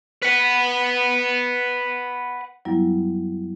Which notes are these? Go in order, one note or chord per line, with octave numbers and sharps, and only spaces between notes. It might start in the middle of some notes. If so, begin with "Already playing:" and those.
B4 F#5
F#2 F#3 G3 B3 E4